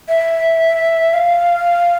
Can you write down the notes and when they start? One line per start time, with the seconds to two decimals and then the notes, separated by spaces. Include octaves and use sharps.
0.09 E5
1.14 F5